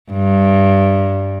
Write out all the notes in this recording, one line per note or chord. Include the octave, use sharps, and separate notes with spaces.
G2